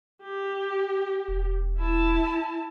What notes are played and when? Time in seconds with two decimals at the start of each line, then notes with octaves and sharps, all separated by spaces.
0.22 G4
1.28 E1
1.79 E4 A5